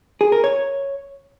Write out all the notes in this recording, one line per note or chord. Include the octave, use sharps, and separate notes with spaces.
G#4
A#4
C#5